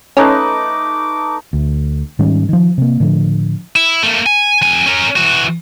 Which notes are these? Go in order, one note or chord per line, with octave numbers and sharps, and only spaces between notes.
A3 C#4 D#4 B4 D6
D2
G#2 D#3 G3 C#4
D#3 F3
C3 A#3
A2 D3 F3
E4
A3 A#3
G#5
F2 G#5
C#4 A#4
E3 F#4